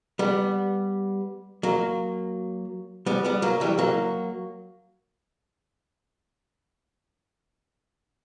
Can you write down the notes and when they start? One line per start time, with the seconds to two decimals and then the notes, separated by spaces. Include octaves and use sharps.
0.19 G3 B3
1.63 F#3 A#3
3.06 G3 B3
3.24 G3 B3
3.42 F#3 A#3
3.61 E3 G3
3.79 F#3 A#3